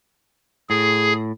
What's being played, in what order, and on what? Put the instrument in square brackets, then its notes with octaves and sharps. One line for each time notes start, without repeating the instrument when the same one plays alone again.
[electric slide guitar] A2 [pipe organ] G#4